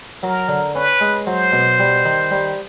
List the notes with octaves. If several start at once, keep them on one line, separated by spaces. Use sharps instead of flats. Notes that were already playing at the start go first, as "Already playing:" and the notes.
F#3 A#4
D3
C#4 B4
G#3
F#3 C5
B2
G3
D#3
G3